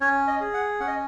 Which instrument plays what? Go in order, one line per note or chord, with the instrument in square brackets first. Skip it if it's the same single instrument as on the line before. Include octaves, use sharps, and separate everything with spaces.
[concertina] C#4 C#5
D#5
G#4
F#5
C#4 F#5
D#5